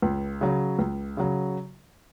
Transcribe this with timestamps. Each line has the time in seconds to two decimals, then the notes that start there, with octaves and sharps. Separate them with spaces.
0.02 C#2
0.41 C#3 F#3
0.79 C#2
1.17 C#3 F#3